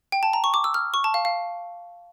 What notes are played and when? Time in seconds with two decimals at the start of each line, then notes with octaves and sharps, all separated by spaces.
0.12 G5
0.23 A5
0.33 A#5
0.44 C#6
0.54 D6
0.64 E6
0.74 F6
0.94 C#6
1.04 A5
1.14 F5
1.25 F5